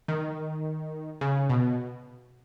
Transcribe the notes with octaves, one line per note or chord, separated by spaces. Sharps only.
D#3
C#3
B2